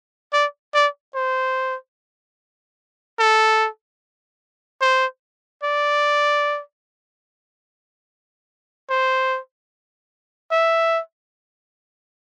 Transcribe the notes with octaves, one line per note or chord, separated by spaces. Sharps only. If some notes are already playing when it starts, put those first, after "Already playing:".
D5
D5
C5
A4
C5
D5
C5
E5